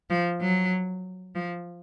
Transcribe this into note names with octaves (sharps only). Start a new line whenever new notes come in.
F3
F#3
F3